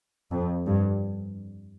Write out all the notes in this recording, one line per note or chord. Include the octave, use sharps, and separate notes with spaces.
F2
G2